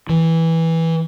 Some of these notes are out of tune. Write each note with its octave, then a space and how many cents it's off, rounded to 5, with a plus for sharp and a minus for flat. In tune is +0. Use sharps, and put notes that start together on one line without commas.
E3 -10